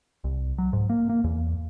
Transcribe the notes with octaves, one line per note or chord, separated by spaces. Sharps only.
C2
F#3
G#2
A#3
A#3
E2